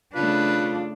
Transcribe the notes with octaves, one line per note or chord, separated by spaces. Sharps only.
C#3 A3 D4 F4 B4